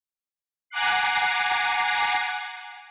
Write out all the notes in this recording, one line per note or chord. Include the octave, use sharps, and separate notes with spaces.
F#5 G#5 A#5 D6 F#6 C7